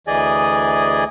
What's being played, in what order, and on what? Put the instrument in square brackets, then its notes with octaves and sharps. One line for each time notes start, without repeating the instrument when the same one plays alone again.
[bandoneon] D2 E3 G#4 D5 D#5 G#5